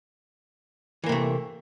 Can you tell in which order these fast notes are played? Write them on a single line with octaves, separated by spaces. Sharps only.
E3 A#3 C3 A3